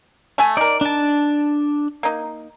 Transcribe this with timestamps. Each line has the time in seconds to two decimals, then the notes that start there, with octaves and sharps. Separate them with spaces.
0.38 A3 E5 G#5
0.57 D#4 A#4 D5
0.81 D4 A5
2.03 A#3 D#4